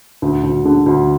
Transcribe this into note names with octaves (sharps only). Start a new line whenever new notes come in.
D2
D2
D3
D2